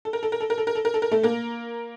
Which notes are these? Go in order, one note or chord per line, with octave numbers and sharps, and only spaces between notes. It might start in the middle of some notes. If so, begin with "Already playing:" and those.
A4
A#4
A4
A#4
A4
A#4
A4
A#4
A4
A#4
A4
A#4
A3 A4
A#3 A#4